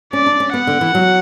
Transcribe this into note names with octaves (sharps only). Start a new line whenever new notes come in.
C#4 D5
D4
C#4
B3 F#5
D3
E3
F#3